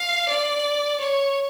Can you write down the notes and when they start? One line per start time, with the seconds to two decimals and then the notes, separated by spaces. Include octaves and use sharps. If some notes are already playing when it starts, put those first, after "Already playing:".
Already playing: F5
0.29 D5
1.00 C#5